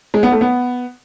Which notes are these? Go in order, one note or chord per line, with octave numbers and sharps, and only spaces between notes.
G#3
B3
A3
B3